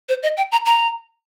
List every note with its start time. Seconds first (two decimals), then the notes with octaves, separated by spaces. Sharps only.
0.09 C5
0.23 D#5
0.37 G5
0.52 A#5
0.66 A#5